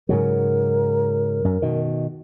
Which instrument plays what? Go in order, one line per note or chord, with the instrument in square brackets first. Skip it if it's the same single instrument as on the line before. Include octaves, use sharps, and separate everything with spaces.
[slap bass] G#2 C#3 F#3 [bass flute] A#4
[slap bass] F#2
B2 D#3